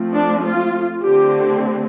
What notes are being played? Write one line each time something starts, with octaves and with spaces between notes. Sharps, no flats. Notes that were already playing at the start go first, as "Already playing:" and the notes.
Already playing: F3 A3 C4
D4
F4
D3 A3 C4 G4